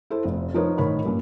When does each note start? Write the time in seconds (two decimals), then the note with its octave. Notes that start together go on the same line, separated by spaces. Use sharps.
0.10 E4 A4 C5
0.25 F1
0.54 F3 D#4 A#4 B4 C#5
0.78 A1 D#3 A#4 C#5 B5
1.05 G2 A#2 C#4